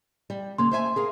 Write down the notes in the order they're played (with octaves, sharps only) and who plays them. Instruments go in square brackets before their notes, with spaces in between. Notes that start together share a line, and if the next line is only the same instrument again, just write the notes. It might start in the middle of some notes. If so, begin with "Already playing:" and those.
[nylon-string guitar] G3
[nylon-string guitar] C#3 A#3 [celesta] C6
[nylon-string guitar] C5 E5 G#5
G#4 A#4 F5